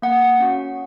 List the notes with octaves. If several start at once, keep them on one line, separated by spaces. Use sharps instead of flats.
A#3 F#5
C#4 F#4